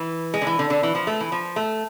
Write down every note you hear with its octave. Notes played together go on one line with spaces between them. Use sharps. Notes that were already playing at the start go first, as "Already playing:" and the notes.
Already playing: E3
G#3
D3
E3
D3
D3
E3
F3
A3
E3
F3
A3